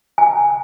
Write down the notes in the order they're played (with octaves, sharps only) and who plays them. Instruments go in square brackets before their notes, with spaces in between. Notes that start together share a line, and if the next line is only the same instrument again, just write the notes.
[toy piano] G#5